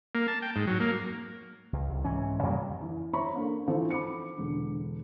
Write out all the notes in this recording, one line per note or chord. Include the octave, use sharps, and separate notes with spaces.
A#3
A5
G5
G#2
F#3
A#3
C#2
C2
G#2 E3 C#4
F2 C#3 G3 A#3
E3
C5 C#5 E5 A#5 B5 C#6
A#3 D4 A4
E3 F3 C4 D4 D#4 A4
B5 D6 C#7
E1 D3